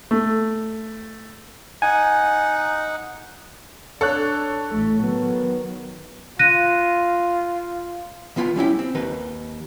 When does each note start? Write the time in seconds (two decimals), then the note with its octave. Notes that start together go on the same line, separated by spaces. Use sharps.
0.11 A3
1.82 D#4 F#5 G#5
4.01 D4 A4 C#5 F#6
4.70 A1 A3
5.03 D#3 F#3 B3
6.39 F4 F#6 A#6 D#7
8.36 D#3 B3 F4 G5 B5
8.56 G3 C#4 E4 G4
8.79 C4
8.95 D#2 D#3 D#4 B4